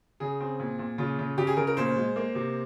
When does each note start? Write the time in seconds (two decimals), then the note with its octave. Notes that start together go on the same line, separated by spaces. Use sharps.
0.20 C#3 G#4
0.40 C4
0.60 A#2
0.79 A#2
0.98 C#3 F4
1.19 C#3
1.38 C#3 G4
1.47 G#4
1.57 C#3 A#4
1.67 A#4
1.77 A#2 C5
1.96 G#3
2.16 A#3
2.35 C3